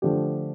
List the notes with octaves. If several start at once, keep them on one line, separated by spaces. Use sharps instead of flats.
D3 F3 A3 D4 G4